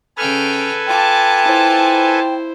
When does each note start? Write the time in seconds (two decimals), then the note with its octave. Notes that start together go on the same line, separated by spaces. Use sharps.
0.17 C#3 A4 B4 G5 G#5 F6
0.87 F4 G5 A5 D6
1.45 E4 C5